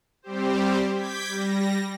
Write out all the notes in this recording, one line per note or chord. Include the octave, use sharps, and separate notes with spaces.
G3 C4 G4 C5
D6 G6 G#6 B6
G3 A#6